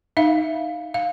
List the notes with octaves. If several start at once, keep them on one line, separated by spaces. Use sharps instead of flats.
D#4 E5 F5
F5